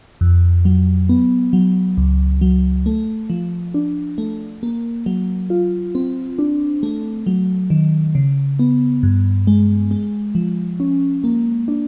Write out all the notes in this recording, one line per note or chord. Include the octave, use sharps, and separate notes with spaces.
F2
F#3
B3
F#3
C#2
F#3
A3
F3
D4
A3
A#3
F#3
F4
C4
D4
A3
F#3
D#3
C#3
B3
G2
G#3
G#3
F3
C#4
A#3
D4